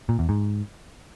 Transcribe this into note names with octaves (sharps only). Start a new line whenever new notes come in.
A#2
E2
G#2